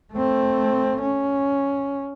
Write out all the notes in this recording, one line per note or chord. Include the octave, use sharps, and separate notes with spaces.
A3 C4
C#4